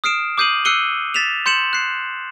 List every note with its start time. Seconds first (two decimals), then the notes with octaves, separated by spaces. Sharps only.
0.04 D#6 F6 C7 D7 E7
0.38 D6 D#6 G6 C7 D#7 F#7
0.65 E6 F#6 C7 C#7 D#7 G7
1.14 A6 B6 E7 F7
1.46 C6 G6 C#7 E7 F#7
1.73 F#6 C7